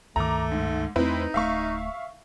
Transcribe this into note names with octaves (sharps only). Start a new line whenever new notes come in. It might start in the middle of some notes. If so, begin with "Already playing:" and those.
C#2 G2 D#3 A3 A#5 D6
G#2
E2 A3 C4 D#4 E4 B4
D1 A3 E5 F5 C#6